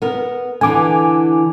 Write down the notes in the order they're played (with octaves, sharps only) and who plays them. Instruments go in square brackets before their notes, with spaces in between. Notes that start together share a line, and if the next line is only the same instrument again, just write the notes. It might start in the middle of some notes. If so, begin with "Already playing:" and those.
[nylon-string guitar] B3 A#4
[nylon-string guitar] D3 E3 [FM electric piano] G#5 D6